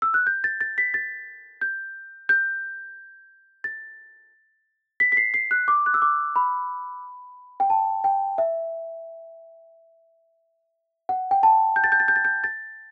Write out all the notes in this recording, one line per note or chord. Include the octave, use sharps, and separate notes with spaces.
E6
F#6
G6
A6
A6
B6
A6
G6
G6
A6
B6
B6
C7
C7
F#6
D6
F#6
E6
D6
B5
G5
A5
G5
E5
F#5
G5
A5
G6
A6
G6
A6
G6
A6
G6
A6